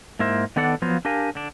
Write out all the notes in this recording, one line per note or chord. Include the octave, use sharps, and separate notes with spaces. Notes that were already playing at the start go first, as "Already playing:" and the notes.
G#2 A#3 E4 A#4 C5
D#3 B3 D4 A4 D5 F#5
F3 F#3 B3 F4 C5
D4 G4 A#4 F5 G#5
D3 D4